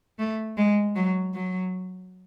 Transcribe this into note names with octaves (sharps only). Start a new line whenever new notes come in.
A3
G#3
F#3
F#3